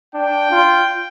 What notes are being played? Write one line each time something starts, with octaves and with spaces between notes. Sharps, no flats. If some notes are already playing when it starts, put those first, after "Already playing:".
D4 G5
F4